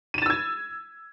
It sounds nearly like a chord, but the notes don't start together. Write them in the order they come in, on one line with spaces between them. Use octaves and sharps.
D#7 E7 A6 E6 G#6